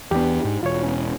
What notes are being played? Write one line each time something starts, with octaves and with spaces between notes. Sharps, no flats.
E2 B3 D4 G4
G#2
E1 F4 C#5
C#4